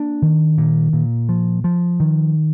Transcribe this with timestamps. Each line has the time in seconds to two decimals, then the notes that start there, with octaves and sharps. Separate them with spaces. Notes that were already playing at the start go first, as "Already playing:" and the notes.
Already playing: A#3 D4
0.22 D#3
0.58 A#2
0.93 A#2
1.29 F3
1.64 F3
2.00 D#3